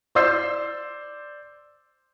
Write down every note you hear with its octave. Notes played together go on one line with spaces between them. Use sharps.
C5 D5 C6 E6 G6 C7